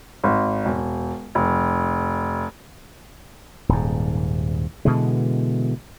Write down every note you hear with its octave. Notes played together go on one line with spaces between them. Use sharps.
G#1
E1
F1
D#1 G#2
B2 D3 E3 G#3